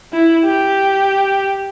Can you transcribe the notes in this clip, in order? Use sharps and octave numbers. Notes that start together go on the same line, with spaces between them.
E4
G4